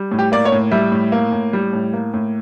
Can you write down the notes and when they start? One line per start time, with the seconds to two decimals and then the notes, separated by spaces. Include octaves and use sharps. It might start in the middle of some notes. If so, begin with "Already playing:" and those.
Already playing: G3
0.11 A2
0.19 G4
0.32 A#3 D5
0.45 C#5
0.52 A2
0.71 G3 E5
0.92 A2
1.12 A#3
1.32 A2
1.53 G3
1.73 A2
1.93 A#3
2.14 A2